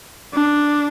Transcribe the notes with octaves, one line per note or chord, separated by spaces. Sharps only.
D4